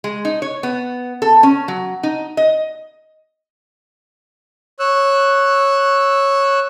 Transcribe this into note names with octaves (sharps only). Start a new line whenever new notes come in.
G#3
D#4
C#5
B3
A4
C#4
F#3
D#4
D#5
C#5 E6 F#6